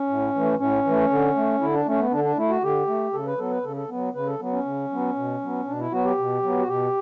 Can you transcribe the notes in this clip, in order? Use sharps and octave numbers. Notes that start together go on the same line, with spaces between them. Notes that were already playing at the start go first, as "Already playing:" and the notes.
Already playing: C#4
A2
E3 A3
A2 C#4
E3 A3
D3
A3
D3 E4
D4
A3 C#4
B3
D3 D4
D4
A3 E4
F#4
D3 G4
A3
C#3 A4
B4
F#3 B3 A4
B4
C#3 A4
A4
F#3 B3
C#3 B4
A4
F#3 B3
C#4
C#3
F#3 B3
B2
F#3 B3
B2 D4
E4
F#3 B3 F#4
G4
B2
F#3 B3
F#4
B2 G4